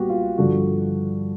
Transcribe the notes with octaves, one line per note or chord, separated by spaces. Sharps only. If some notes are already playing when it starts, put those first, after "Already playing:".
Already playing: A#2 G3 B3 F#4 G4
F4
G2 D3 F3 F#4